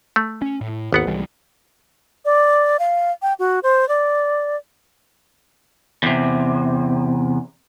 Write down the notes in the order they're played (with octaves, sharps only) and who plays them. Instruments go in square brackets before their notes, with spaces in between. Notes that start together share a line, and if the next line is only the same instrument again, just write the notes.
[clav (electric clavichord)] A3
[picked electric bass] C#4
A2
[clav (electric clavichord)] G#1 B3 F#5 [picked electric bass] D#2
[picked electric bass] C2 E3 G3
[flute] D5
F5
G5
F#4
C5
D5
[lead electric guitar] E2 C3